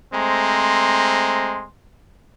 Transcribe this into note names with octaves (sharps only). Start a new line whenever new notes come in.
G#3 A3 C4 C5 A#5 C6